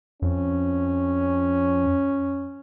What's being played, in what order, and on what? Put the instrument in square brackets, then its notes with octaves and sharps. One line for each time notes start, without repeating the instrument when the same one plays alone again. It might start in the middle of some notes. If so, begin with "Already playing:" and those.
[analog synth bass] F2 [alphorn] C#4